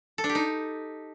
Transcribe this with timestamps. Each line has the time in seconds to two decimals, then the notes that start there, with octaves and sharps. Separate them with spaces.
0.18 A4
0.24 D4
0.29 G4
0.35 D#4